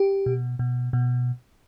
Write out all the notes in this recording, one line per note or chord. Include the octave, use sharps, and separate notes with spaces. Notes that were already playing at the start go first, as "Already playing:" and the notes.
Already playing: G4
B2
B2
B2